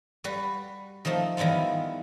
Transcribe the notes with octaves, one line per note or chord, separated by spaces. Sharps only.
G3 F#4 B4
D#3 F3 A3 D#4
D#3 E3 G3 B3 F4